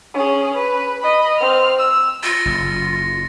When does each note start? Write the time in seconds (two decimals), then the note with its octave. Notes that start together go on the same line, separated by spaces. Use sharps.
0.14 C#4 G#4
0.54 B4
1.01 D#5 B5
1.39 C4 F6
1.79 E6
2.23 F4 A6 A#6 C#7
2.45 F#1